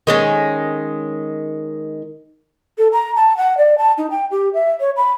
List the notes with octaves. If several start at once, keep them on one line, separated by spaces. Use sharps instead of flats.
D#3 G#3 C#4
A4
A#5
A5
F#5
D5
A5
D#4
G5
G4
E5
C#5
B5